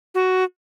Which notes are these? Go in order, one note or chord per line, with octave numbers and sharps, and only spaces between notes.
F#4